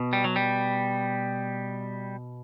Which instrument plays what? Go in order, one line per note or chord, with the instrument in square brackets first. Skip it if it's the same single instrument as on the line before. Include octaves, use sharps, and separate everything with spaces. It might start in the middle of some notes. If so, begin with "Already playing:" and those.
Already playing: [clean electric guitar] B2
G3
F#3
G3